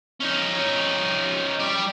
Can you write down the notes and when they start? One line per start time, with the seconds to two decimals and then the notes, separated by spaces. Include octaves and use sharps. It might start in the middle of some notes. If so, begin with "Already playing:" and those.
0.20 C#4 D#4
1.59 G3 D5